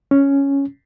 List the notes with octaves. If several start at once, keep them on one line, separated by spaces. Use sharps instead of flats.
C#4